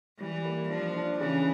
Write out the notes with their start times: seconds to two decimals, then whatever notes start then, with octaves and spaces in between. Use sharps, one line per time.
0.20 E3 G3
0.45 A#3
0.70 F3 D4
0.95 D4
1.20 C#3 E3